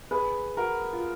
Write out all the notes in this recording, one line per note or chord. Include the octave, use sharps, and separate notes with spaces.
G#4 B4
F#4 A#4
F4